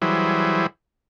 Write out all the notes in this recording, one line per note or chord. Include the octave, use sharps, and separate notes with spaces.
E3 F#3 G3 E4 G#4 C5